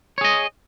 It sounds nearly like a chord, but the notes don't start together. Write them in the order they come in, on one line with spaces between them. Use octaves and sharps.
C#5 G#4 D#5